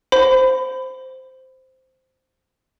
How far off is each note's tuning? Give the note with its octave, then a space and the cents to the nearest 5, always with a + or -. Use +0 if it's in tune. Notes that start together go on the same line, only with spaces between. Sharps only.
C5 -5 B5 +25